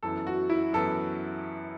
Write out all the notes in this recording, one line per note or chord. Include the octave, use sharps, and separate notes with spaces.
F#2 E3 B3 A4
F#4
E4
F#2 E3 B3 A4